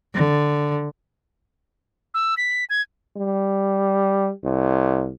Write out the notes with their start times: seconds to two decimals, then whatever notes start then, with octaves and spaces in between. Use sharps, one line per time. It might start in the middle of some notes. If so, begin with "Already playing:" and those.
0.14 D3
2.14 E6
2.37 B6
2.70 G#6
3.17 G3
4.44 C2